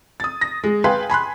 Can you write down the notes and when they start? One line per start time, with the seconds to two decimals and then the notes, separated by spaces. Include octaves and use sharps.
0.20 D#6 A6
0.41 A#6
0.64 G#3
0.84 B4 F5 G5 G#5 C6
1.10 G#5 B5 C6 F#6